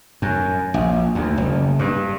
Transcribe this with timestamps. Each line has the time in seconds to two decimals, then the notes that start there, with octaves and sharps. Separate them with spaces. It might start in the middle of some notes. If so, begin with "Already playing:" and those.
0.22 F#2
0.74 A#1
1.15 D2
1.37 F#1
1.79 G2